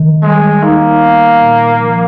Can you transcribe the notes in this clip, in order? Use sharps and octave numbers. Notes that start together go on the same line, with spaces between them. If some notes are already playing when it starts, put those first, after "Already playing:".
Already playing: D#3
G3 G#3
A#3 D#4
B3
A#2
F3